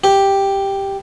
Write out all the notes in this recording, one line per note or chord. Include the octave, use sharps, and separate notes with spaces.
G4